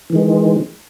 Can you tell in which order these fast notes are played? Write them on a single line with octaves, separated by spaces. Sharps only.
E3 D#3 G#3